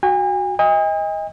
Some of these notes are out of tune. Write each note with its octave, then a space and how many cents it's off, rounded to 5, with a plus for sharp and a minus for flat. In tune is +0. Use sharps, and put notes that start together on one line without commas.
F#4 +0 G#5 -40
D#5 +25 G#5 -45